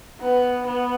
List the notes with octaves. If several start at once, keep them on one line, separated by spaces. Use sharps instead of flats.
B3
B3